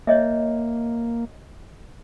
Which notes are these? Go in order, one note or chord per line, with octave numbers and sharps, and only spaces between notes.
A#3 C#5 D#5 E5